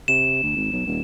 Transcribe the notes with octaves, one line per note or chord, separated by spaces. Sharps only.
C3 E7
D2
G#1
B1
D#1